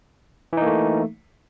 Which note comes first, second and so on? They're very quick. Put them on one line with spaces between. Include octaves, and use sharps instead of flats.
E3 D#4 A#3 A3